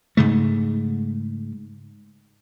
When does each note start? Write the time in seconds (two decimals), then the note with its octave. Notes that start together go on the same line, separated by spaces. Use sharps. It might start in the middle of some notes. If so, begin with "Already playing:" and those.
0.17 G#2 C#3 A3